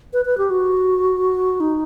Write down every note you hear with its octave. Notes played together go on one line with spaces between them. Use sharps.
B4
B4
G4
F#4
D#4